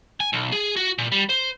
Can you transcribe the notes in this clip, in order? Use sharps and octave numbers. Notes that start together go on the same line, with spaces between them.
G#5
B1
G#4
F#4
A#2
G3
C5